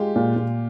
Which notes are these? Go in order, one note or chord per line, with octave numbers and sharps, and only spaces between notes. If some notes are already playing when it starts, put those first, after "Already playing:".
Already playing: G#3 F4 G4
A#2
A#2